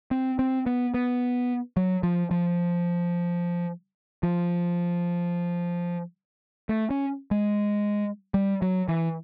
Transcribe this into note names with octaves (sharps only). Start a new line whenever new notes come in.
C4
C4
B3
B3
F#3
F3
F3
F3
A3
C#4
G#3
G3
F#3
E3